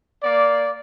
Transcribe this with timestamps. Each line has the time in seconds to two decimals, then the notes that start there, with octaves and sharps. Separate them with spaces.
0.23 A#3 D5